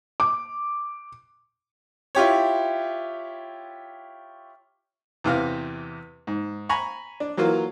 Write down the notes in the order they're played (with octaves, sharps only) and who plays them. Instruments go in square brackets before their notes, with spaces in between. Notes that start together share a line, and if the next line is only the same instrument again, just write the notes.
[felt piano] D6
[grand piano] E4 F4 G4 C#5
[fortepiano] E2 C3 E3 F5
G#2
G#5 A#5 B5 C#6
D4
E3 F#3 A#3 F4